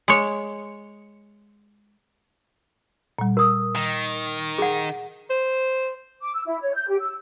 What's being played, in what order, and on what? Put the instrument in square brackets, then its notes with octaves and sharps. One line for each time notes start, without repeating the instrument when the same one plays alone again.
[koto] G#3 C#5
[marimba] A#2 G3
[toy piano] A#4 D#6
[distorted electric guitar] D#3
[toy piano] G#4 F#5
[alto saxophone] C5
[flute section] D6
E6
E4
C#5
G6
G4
E6